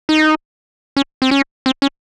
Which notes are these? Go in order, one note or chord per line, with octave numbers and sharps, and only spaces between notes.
D#4
C#4
C4
C#4
C4
C#4